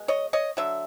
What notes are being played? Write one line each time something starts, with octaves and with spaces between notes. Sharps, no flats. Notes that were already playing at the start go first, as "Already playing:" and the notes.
Already playing: B2 G#3
C#5 D#5
C#5 D#5
D3 F#3 E5